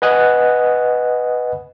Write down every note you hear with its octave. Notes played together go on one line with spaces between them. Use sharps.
B4 D#5 F#5 G#5 D#6 F#6